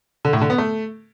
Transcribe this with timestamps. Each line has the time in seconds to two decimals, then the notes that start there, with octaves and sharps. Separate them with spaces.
0.25 D3
0.33 A2
0.41 D3
0.50 B3
0.58 A3